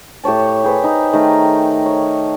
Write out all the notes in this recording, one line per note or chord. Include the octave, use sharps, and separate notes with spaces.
A2 G4 C#5 A5
G4 G#4 B4 C5
D#4
D#3 A3 A#4
C#5